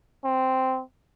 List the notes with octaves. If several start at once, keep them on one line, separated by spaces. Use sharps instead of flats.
C4